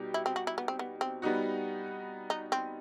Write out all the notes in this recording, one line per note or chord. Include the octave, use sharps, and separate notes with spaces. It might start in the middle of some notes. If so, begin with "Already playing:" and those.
Already playing: B2 G3 D#4 G4
E4
C4
F#4
E4
B3
C4
B3
C4
G3 B3 D#4 F#4
D#4
C4